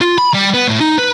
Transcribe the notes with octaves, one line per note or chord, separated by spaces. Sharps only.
F4
B5
G3
B3
A2
D#4
B4